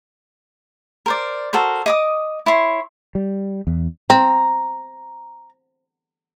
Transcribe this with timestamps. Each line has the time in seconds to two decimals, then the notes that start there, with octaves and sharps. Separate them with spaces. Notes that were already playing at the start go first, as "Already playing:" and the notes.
1.06 A#4 C5 D5
1.53 F#4 A4 A#4 C5
1.86 D#5 D6 D#6
2.46 E4 C#5 C6
3.15 G3
3.67 E2
4.10 C4 A#5